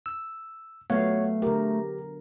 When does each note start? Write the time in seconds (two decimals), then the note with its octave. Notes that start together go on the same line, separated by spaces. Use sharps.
0.06 E6
0.90 F#3 A3 B3 C#5 F5 F#5
1.42 D3 G4 A#4